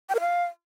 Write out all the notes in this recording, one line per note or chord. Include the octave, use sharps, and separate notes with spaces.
G5
A#4
F5